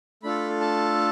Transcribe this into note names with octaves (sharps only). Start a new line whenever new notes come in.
A3 D4 F4 A4 B5
A5